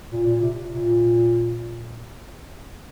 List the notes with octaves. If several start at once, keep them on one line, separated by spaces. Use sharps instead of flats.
A#2
A#2
C3
A#2